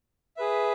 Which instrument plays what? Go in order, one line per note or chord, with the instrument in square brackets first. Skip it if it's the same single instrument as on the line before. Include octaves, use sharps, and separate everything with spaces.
[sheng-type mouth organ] G#4 B4 E5